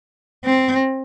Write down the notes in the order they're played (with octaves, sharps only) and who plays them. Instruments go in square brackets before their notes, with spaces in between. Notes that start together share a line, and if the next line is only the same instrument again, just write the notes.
[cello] C4